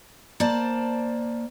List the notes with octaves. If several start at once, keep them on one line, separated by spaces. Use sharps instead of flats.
A#3 C5 D5 A5